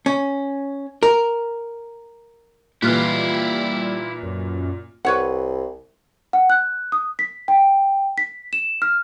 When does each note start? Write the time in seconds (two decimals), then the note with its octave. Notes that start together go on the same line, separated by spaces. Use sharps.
0.06 C#4
1.03 A#4
2.82 A#2 E3 G3 E4 F4 F6 F#6
4.23 F#2
5.05 C2 B4 C#5 F#5
6.33 F#5
6.50 F#6
6.92 D#6
7.19 B6
7.48 G5
8.18 B6
8.53 E7
8.82 F6